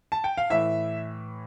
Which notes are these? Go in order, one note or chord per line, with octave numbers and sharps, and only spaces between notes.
A5
G5
F5
A2 E3 E5